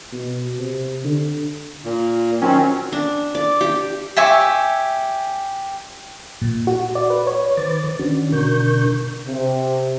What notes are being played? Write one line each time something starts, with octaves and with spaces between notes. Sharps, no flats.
B2
C3
D3
A#2
D#3 F#3 C4 C#4
D4
D5
G4
G4 E5 G#5 C#6
A#2
F#4
D5
B4
C#5
D#3 B4 C5 D6 A6
D#3 C#4 D4 F#4
B2 D3 D4 A#4 C#6 G6
C3